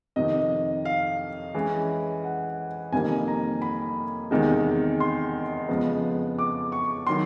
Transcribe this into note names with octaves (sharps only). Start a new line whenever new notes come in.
F2 C3 D#3 D#5
F5
E3 G#3 C#4
F#5
F2 C3 D#3 G3 A#3 G#5
A#5
B5
E2 C3 D#3 G#3
C6
F2 C#3 F3 G#3 B3
D6
C#6
D#3 F#3 C6